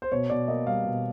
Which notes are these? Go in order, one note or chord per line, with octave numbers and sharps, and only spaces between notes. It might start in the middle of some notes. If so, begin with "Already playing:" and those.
C5
B2 C#5
B2 D5
A#3 D#5
G3 F5
B2